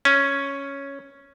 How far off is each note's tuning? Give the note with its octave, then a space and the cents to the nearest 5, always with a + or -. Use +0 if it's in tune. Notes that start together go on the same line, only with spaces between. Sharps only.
C#4 +0